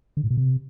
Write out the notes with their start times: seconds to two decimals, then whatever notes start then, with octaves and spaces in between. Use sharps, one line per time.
0.17 D3
0.24 A2
0.30 B2
0.37 C3